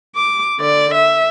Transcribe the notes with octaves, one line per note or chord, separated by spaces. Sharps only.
D6
D3 D5
E5